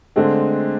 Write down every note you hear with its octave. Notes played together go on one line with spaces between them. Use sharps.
D3 G#3 A3 C4